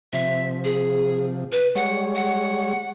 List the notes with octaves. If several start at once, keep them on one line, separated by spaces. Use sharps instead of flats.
C3 F3 E5
G#4
B4
G3 G#3 C#5 F#5
F#5